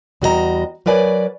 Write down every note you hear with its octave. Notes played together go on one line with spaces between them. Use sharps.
E2 G3 F#4 G#4 D#5 A#5
F#3 A#4 B4 D5 G#5